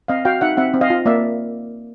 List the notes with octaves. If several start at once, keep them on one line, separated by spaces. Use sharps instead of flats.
C4 D#5 F5
F#4 F5 G5
D#4 E5 F#5
C4 E5 F#5
C4
D#5 F5
F4
A#3 D5 E5